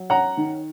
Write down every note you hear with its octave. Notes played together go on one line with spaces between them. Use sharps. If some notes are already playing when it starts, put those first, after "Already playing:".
Already playing: F#3
C#4 F#5 A#5
D#3